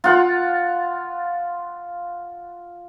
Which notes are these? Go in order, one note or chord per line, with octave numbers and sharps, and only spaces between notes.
F4 F#5